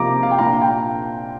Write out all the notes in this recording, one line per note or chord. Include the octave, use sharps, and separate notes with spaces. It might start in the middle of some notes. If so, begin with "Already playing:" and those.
Already playing: C3 F3 A#3 F4 A#5 D6
F5
G5
A#2 A#3 D4 F4 F5 A#5
G5